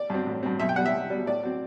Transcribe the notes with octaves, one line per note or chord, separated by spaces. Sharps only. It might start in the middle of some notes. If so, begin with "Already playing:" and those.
Already playing: D5
G2 F#3 C4
A1
G2 F#3 C4
B1 E5
G5
B2 G3 F#5
E5
B1
B2 G3
A2 D5
F#3 C4